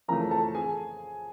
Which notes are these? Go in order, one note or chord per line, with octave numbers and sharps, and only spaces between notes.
F2 C#3 E3 A3 A#4 A#5
A4 A5
G#4 G#5